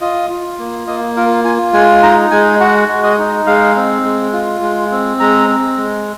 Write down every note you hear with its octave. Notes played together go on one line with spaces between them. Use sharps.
F4 D#5
F4
A#3
A#3 D#5
F4 A#4
F4 G#5
G#3 G#5
D#4 A#5
G#3 G#5
F#4 F#5
G#3
D#5
D#4
G#3 F5
C4
G#3
F4
G#3
C4
G#3 A#5
C4
G#3